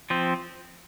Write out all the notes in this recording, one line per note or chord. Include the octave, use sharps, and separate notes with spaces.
F3 C4